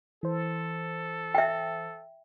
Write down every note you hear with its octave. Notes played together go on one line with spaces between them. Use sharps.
E3 A4 C5
E5 G5